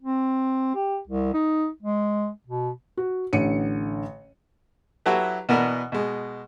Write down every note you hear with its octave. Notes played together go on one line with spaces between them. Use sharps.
C4
G4
C2
D#4
G#3
B2
F#4
A1 D3 C#7 D#7
F#3 E4 F#4 G4 A4 B4
B2 E3 B3 D4 A#4
B2 G#3